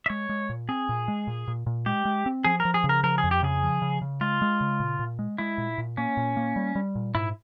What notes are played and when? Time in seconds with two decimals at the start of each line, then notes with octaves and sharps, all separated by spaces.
0.06 E5
0.10 G#3 C#5
0.29 G#3
0.49 A#2
0.69 C4 G#4
0.89 A#2
1.08 G#3
1.27 A#2
1.48 A#2
1.67 A#2
1.86 G#3 G4
2.05 G#3
2.26 C4
2.45 F3 G#4
2.60 A#4
2.65 F3
2.74 G#4
2.84 C#3
2.89 A#4
3.03 F3 A#4
3.18 G#4
3.24 F2
3.31 G4
3.43 C#3 G#4
3.63 F3
3.82 C#3
4.02 C#3
4.21 G#3 F4
4.42 G#3
4.61 C#3
4.80 A#2
4.99 A#2
5.19 G#3
5.38 G#3 E4
5.58 A#2
5.78 A#2
5.97 A#3 C#4
6.17 A#2
6.37 A#3
6.56 G3
6.75 G3
6.95 A#2
7.15 G#2 E4